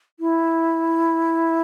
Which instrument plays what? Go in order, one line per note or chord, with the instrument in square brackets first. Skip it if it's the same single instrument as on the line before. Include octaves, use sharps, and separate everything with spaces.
[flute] E4